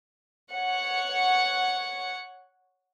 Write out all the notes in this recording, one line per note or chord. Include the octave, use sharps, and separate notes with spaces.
C#5 F#5 C#7